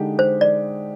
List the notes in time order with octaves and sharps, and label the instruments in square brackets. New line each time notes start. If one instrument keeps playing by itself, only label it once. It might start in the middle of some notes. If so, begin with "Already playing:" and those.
Already playing: [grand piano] D3 G#3 D#4 G4
[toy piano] C5
D5